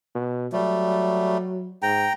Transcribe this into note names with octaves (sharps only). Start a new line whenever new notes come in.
B2
F#3 G3 A3
G#2 G5 A#5